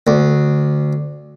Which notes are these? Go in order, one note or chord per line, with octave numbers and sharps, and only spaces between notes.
D2